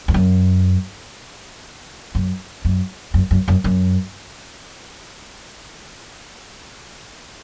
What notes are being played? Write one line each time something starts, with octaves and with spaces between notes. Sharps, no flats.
E2
F#2
F#2
F#2
F#2
F#2
F#2
F#2